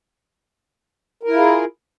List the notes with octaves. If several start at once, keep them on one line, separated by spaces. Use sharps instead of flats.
E4 F4 G#4 A#4